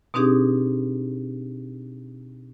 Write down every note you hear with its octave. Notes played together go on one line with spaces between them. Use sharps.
B2 C4 D4 D#4 G4 G#4